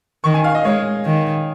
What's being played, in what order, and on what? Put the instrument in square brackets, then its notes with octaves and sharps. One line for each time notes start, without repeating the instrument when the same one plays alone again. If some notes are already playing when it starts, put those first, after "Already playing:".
[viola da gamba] D#3 [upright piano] C#6
[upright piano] G#5
F5
D#5
[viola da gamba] G#3 [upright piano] C#5
[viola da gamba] D#3